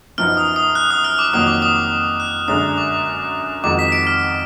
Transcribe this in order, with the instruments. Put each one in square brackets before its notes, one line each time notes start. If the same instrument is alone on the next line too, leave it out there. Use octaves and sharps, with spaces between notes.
[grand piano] F#2 F3 B3 D#4 [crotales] F6
[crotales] D#6
D#6
F#6
D#6
F6
D6
[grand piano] F2 D#3 F#3 A#3 [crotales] D#6
[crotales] D6
D#6
D6
F#6
[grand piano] F#2 D3 G#3 D4 [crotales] D#6
[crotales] D6
[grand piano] F2 D#3 G#3 D#4 F#4 [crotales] D6
[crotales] B6
D7
F6